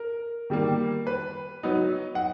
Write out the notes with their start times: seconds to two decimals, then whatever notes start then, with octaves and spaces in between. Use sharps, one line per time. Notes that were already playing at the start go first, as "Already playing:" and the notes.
Already playing: A#4
0.50 D#3 G3 A#3
1.07 B4
1.63 F#3 B3 D#4
2.15 F#5